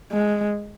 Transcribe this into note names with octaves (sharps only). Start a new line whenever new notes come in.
G#3